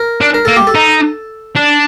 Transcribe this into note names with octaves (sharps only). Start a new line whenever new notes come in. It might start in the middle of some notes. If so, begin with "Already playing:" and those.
Already playing: A#4
D4
A#4
A#3 A4
G4
A4
D#4
D4